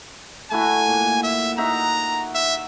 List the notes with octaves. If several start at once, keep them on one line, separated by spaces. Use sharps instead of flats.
A3 E4 F#4 G#5
A#2
E5
D#4 F#4 E5 A#5
E5